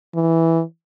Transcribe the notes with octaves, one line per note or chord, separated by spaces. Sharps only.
E3